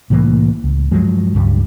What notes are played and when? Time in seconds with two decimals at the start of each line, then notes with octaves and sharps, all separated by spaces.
0.10 C2 A2 E3 A#3
0.64 C#2
0.91 G2 F3 F#3 G#3
1.35 C#2 G2 G3